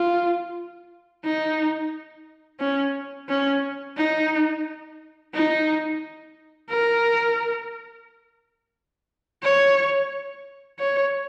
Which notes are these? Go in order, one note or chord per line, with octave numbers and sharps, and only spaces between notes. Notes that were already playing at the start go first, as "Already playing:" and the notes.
Already playing: F4
D#4
C#4
C#4
D#4
D#4
A#4
C#5
C#5